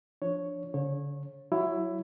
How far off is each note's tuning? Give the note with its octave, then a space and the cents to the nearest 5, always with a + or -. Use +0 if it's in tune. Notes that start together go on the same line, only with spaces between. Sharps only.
F3 +0 D4 +0 C#5 +0
D3 -45 C#5 -25
F#3 +0 E4 +15 C#5 +0